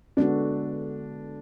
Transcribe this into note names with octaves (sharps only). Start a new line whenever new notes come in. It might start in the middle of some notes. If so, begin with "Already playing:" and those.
D3 G#3 B3 D4 F#4 A4